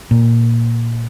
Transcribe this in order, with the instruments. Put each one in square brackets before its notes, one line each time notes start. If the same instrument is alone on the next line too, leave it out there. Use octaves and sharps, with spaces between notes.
[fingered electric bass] A#2